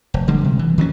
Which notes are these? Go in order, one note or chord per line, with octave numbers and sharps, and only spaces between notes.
F1
D3 G3 G#3
C3
E3
D#3 F#3 B3 C#4